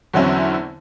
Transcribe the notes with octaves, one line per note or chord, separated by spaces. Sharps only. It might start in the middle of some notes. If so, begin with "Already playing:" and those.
E2 D3 F#3 C4 C#4 E4